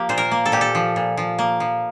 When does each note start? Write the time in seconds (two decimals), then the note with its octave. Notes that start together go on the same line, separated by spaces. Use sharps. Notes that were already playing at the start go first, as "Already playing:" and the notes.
Already playing: F3 A#3 G4
0.09 A#2 C5
0.18 A#4
0.31 A#3
0.46 A4
0.52 A#2 G4
0.61 A4
0.75 F3
0.96 A#2
1.17 F3
1.39 A#3
1.60 F3